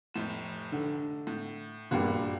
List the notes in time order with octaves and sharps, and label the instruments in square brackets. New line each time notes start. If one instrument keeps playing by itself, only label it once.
[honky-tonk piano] F1 A2 E7
[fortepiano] D3
[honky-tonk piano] A2
[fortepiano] A#1 G2 [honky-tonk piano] A#3 F#4